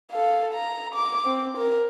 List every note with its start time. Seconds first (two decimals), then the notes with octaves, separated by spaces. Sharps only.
0.12 A4 F5
0.54 A#5
0.95 D6
1.26 C4
1.57 A#4